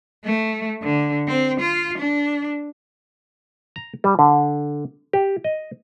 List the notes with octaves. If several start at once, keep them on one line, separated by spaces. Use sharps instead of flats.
A3
D3
C4
F4
D4
A#5
G3
D3
G4
D#5